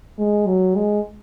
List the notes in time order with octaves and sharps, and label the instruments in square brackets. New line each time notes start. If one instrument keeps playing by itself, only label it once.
[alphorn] G#3
F#3
G#3